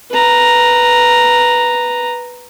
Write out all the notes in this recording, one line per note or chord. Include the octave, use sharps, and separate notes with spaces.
B4 A#5